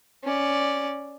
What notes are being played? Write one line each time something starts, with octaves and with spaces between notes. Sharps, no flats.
C#4 D5